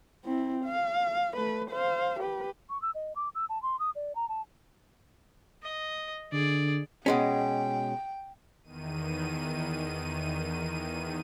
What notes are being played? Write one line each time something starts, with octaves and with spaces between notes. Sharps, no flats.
C4 E4
F5
A3 B4
C5 F5
G4 B4
C#6
E6
D#5
D6
E6
A5
C6
D#6
D5
A#5
A5
D#5
D3 G#4 D5
B2 G#3 C#4 G5
E2 D#3 D#7